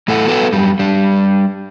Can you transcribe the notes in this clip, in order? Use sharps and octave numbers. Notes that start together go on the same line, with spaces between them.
E2 A2 E4 A4 F#5
B3 F#4 A4 B4 F#5
F#2 G3
G3 D4